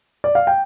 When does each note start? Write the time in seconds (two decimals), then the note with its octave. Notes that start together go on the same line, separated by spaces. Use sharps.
0.24 D5
0.35 F5
0.47 G5